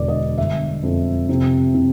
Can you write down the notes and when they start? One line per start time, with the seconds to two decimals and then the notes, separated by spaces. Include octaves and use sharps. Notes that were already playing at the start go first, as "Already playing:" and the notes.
Already playing: E1 D3 D5
0.08 D#5
0.38 G1 E5
0.83 F2
1.29 C3
1.74 C3